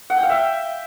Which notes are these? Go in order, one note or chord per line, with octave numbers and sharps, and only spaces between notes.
F#5
G5
F5
E5